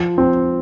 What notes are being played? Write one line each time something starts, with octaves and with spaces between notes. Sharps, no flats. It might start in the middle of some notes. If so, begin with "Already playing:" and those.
Already playing: F3
C4